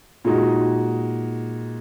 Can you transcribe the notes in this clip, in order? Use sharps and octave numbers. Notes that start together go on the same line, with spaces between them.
A#2 G#3 D#4 F#4